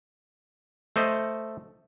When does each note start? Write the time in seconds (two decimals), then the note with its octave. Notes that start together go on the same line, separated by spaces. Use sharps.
0.96 A3 C5 D#5